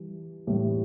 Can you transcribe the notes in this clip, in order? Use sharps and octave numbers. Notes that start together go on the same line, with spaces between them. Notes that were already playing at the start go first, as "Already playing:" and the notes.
Already playing: E3 G3
A2 E3 G3